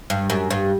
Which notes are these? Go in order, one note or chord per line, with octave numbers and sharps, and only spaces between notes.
G2
F#2
G2